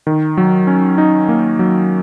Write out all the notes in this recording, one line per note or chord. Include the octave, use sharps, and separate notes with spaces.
D#3
F#3
C#4
D#4
A#3
F#3